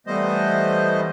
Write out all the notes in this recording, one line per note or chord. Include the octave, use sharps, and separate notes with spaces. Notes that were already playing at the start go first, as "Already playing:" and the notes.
E3 G3 A3 B3 C5 D#5